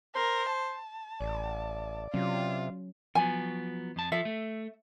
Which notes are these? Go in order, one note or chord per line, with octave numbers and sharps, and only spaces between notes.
A#4 C5
A5
A1 D5
C3 F#3 C#4 F4
F3 F#3 B3 G#5
F2 A5
F3 A4 E5
A3